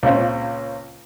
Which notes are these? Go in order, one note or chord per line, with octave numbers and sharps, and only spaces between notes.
C#2 A#2 C#3 C4